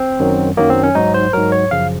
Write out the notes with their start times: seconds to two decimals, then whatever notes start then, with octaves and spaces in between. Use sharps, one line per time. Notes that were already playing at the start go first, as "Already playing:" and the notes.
Already playing: C4
0.20 F#2 D#3 F#3
0.57 F#2 D#3 F#3 A#3
0.70 C4
0.83 C#4
0.95 G#2 F#3 D#4
1.14 C5
1.33 G#2 F#3 A#4
1.52 C#5
1.71 F#2 C#3 F3 F5